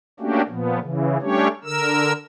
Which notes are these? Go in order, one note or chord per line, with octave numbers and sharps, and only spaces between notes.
A3 A#3 C#4 D4 F#4 G4
A#2 F3 B3
C#3 E3
G3 A3 C#4 D4 G4 C#5
D3 A#4 E6